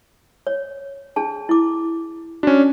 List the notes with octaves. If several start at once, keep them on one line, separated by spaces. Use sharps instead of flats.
C#5
D4 G#4 A5
E4 D6
C#4 D4 F#4